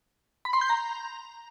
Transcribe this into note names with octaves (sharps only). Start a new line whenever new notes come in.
B5
C6
G6
A#5